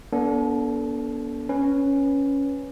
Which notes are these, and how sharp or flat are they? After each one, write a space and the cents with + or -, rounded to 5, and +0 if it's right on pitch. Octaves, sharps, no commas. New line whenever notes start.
B3 -35 D4 -40 A4 +0
C#4 +0 B4 +0